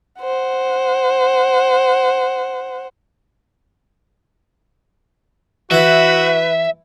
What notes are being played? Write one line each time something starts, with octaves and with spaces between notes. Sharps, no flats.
C5 F#5
E3 E4 F#4 B4 E5